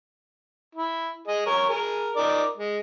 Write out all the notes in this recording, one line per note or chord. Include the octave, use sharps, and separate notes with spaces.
E4
G#4 D#5
A#4 C#5
G#4 A#4
D#4 A#4 D5
G#3